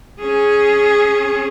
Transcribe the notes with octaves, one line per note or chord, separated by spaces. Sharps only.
C#4 G#4